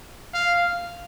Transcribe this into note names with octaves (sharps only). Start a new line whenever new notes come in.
F5